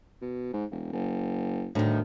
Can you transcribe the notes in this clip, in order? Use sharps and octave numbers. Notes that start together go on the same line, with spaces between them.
B2
G#2
E1
F#1
D2 A2 D#3